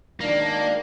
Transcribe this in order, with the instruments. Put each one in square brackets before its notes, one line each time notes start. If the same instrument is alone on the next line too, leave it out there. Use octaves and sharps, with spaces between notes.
[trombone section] G#1 D#3 D4 [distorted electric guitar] A#3